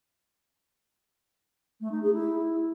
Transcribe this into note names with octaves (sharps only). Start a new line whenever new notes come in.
A3
D#4
G#4
E4